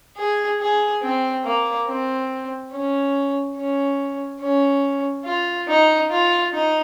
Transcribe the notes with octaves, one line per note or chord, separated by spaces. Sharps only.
G#4
G#4
C4
A#3
C4
C#4
C#4
C#4
F4
D#4
F4
D#4